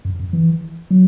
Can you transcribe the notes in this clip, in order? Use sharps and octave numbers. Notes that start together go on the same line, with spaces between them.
F#2
F#2
E3
F#3